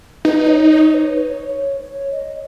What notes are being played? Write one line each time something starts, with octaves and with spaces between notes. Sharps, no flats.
D#4 B4
D#5
C#5
C#5
B4
C#5
C#5
C#5
D#5